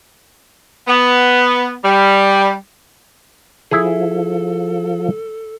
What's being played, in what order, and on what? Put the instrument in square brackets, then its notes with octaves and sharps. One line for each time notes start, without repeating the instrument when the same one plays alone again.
[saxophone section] B3
G3
[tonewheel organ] F3 [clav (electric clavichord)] E4 G#4 [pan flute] A4